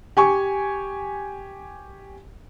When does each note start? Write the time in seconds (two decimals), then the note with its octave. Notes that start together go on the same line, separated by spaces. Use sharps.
0.17 G4 G#5 C#6